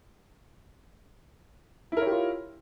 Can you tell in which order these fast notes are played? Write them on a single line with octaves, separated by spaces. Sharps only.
E4 A#4 C#5 G4 F4